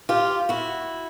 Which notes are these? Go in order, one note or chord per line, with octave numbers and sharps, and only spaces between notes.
F4 G4
E4 F#4